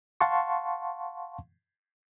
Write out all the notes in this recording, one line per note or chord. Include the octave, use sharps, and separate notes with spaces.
F5 F#5 A5 C6 C#6